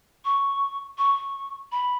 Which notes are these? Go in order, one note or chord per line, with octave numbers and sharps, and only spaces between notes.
C#6
C#6
B5